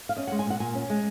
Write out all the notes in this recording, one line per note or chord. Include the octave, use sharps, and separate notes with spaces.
F5
C#4 D#5
G#3 F#5
G#5
A#2 F#5
A#2 G#5
C#4
G#3